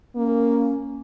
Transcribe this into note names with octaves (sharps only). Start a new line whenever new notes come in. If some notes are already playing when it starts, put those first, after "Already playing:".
A#3 C#4